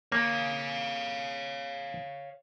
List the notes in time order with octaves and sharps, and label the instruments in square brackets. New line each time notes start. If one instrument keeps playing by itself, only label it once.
[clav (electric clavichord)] A#3 [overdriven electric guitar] C#5 F5